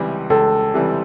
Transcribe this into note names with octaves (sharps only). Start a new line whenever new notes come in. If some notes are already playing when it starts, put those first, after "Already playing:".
Already playing: C#2 C3 E3 G3
C#2 A4
C3 E3 G3